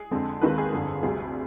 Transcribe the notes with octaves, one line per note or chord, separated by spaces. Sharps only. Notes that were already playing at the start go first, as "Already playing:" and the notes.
Already playing: G#4
F2 D3 G#3 C4
D#2 D#3 G#3 C4 B4
G#4
G1 F2 D3
D2 C3 G3 G#4